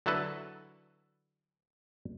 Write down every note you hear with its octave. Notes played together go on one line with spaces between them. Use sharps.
D3 F#3 E4 F#4 A4 B4